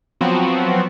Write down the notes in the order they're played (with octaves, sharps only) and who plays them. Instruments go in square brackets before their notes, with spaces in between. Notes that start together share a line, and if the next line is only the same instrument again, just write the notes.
[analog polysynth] F3 F#3 B3 C4 F#4